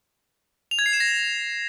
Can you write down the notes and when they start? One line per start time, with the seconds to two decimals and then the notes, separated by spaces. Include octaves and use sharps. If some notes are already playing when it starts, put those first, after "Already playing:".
0.71 F7
0.79 G#6
0.86 C7
0.93 E7
1.00 A#6